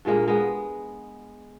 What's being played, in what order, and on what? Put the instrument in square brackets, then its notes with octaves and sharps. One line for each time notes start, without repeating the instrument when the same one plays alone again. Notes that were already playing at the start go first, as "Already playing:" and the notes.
[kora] G2 A#2 G#3 A#3
G#3 B3